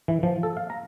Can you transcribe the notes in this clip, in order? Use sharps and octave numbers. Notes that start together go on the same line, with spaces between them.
E3
F3
A4
F5
A#5